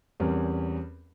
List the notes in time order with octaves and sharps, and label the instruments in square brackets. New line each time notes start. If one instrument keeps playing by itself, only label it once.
[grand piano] E2 G3 C4 C#4 A#4